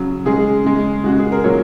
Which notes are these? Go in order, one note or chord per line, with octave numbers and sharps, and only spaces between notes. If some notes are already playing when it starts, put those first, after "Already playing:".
Already playing: C#3 F#3
C#3 G#3 G#4
C#3 G#3
C#3 G#3 F#4
G#4
A#4
A#2 F#3 C#5